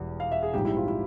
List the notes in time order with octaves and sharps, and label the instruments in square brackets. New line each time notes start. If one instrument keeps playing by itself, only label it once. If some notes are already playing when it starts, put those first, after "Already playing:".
Already playing: [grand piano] E1 E2 G3
F5
E5
G#4
A#1 G#2 G3 C4 G4
E4
F4
E4